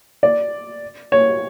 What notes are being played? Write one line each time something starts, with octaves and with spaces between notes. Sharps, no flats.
D5
C#5